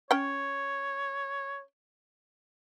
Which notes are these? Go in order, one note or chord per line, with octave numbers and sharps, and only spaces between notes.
C#4 C#5 G5